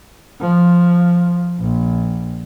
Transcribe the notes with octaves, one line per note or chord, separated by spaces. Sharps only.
F3
A#1